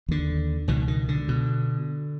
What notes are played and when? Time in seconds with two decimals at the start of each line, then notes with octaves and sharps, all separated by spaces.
0.08 D#2 D3
0.68 C#2 B2 D#3
0.88 D#3
1.08 D3
1.28 B2